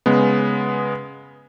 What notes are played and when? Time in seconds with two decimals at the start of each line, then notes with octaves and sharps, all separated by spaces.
0.06 C#3 G#3 B3